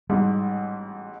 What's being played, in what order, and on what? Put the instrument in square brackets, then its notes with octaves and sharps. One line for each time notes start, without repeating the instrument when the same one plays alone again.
[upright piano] A1 G#2 B2 [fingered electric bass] G3